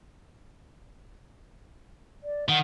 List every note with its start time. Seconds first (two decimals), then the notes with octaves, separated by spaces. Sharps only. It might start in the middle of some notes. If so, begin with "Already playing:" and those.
2.24 D5
2.49 D#3 F#5